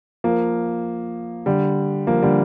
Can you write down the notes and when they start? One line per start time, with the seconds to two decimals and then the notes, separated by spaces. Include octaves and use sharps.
0.24 F3 A#3
1.46 D3 G3
2.07 F3 A#3
2.23 D3 G3